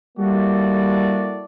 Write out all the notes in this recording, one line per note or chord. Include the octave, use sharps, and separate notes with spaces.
G3 A#3 E4 F#4 A4 D5